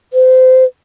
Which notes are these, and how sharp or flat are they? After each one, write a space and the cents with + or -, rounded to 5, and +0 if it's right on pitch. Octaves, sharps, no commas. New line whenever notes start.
C5 -25